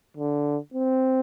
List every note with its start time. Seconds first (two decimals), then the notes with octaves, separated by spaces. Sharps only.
0.17 D3
0.74 C4